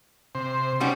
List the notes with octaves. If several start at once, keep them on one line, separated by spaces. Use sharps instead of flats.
C3 C5
G3 B3 C#4 D#4 F#4